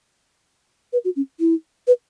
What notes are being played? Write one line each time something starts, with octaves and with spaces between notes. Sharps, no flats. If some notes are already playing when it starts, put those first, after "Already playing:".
B4
F#4
C#4
E4
B4